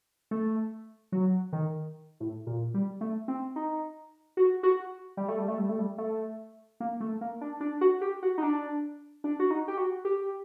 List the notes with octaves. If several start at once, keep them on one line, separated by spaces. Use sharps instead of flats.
A3
F#3
D#3
A2
A#2
G3
A3
C4
D#4
F#4
F#4
G3
A3
G3
A3
G3
A3
G3
A3
A#3
A3
A#3
D4
D4
F#4
G4
F#4
D#4
D4
D4
F#4
D#4
G4
F#4
G4